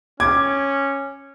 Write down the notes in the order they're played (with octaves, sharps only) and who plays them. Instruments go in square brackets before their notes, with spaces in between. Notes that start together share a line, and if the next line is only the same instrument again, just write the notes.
[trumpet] C#4 [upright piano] D6 [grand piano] G#6